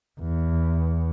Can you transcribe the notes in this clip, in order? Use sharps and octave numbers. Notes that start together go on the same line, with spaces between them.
E2